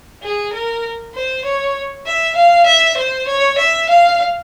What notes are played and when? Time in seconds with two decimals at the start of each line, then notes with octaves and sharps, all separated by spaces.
0.23 G#4
0.53 A#4
1.15 C5
1.44 C#5
2.06 E5
2.36 F5
2.66 E5
2.97 C5
3.27 C#5
3.58 E5
3.90 F5